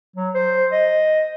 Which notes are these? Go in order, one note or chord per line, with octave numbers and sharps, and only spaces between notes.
F#3
C5
D#5